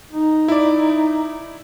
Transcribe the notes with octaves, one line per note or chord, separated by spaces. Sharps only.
D#4
E4 D5